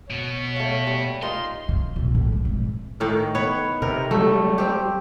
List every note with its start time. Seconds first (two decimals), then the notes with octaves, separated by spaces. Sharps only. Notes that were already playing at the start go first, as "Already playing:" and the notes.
0.10 B2 B3 C#5
0.56 A3 F5
0.87 G3
1.22 D#4 F4 A#4 C6
1.69 C#3
1.96 B1 A2
2.15 A#1 A2
2.32 G3
2.45 G#1 E3
3.00 A2 D#3 A#4
3.35 B3 B4 C#5
3.82 C3 A#4
4.11 F#3 G3 A3
4.58 C4 G4